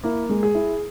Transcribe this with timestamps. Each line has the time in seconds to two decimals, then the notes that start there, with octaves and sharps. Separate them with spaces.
0.04 A#3 E4
0.29 G#3
0.43 G#4
0.55 E4